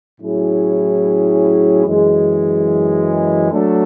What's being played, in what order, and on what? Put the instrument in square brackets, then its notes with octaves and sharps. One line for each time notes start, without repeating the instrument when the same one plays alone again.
[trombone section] A2 F#3 C#4 E4 G#4
F#2 E3 G#3
F#3 A3 D4 A4